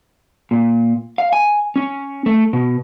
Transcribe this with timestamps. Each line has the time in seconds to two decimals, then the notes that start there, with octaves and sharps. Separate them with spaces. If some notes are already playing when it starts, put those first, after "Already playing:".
0.51 A#2
1.18 F5
1.33 G#5
1.76 C#4
2.26 A3
2.53 B2